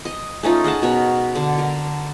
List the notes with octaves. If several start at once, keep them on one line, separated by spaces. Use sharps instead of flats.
D#5
A3 C#4 D#4 F4
G#4 D#5 F#5 A5
B2 A#4 C#5
D3
A#4